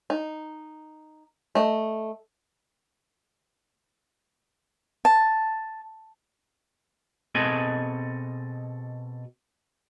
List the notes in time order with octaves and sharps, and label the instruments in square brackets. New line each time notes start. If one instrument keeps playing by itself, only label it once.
[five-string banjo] D#4
A3 D#5
[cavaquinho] A5
[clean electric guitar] B2 C4 G#4 A4 D#5 G#5